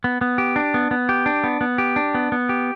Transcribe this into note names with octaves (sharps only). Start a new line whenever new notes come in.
B3
B3
G4
D4
B3
B3
G4
D4
B3
B3
G4
D4
B3
B3
G4